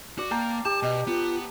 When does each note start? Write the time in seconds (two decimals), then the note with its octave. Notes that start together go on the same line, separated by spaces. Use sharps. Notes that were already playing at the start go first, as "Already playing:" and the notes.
0.19 F#4 D5
0.31 A#3 G5 A5 A#5
0.65 G4 A5
0.83 B2 D#5
1.07 B3 F4